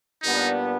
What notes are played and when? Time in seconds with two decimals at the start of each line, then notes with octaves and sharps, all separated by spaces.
0.22 A#2 G3 B3 D4 D#4